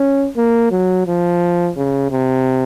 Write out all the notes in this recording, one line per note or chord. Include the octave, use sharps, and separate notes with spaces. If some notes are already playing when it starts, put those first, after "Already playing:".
Already playing: C#4
A#3
F#3
F3
C#3
C3